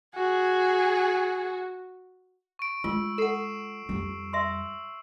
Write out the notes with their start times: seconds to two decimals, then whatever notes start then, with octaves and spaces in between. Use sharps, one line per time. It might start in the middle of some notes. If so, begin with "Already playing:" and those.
0.15 F#4 G#4
2.59 C#6 D7
2.84 G#3 F4 E6
3.18 A4 F#5 C7 E7
3.89 F2 G3
4.33 E5 C6 E6